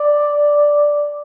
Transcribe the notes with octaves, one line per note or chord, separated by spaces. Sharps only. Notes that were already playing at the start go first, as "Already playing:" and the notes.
Already playing: D5